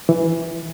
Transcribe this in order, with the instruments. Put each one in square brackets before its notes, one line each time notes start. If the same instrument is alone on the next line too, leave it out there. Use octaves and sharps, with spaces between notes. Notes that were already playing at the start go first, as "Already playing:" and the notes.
[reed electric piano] E3